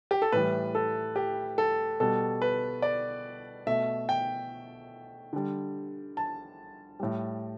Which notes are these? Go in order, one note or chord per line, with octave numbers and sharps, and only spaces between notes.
G4
A4
A2 E3 G3 B4
A4
G4
A4
B2 G3 A4
B4
D5
B2 A3 E5
G5
D3 G3
A5
A2 G3